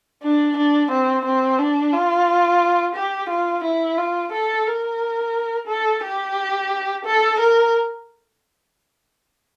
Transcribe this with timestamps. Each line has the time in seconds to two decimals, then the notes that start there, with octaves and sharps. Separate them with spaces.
0.23 D4
0.56 D4
0.91 C4
1.25 C4
1.59 D4
1.93 F4
2.95 G4
3.29 F4
3.64 E4
3.97 F4
4.32 A4
4.67 A#4
5.68 A4
6.03 G4
7.05 A4
7.39 A#4